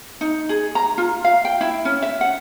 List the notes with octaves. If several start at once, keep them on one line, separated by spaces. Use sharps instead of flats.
D#4
G#4
A#5
F4
F5
G5
E4
C#4
E5
F#5